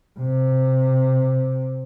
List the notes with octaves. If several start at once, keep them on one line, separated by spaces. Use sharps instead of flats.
C3